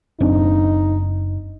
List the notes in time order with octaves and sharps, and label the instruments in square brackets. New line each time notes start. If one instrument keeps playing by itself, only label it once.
[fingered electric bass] F#1 C4 D4 [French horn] D#4